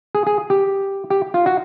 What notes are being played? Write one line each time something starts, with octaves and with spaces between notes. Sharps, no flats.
G#4
G#4
G4
G4
F4
F#4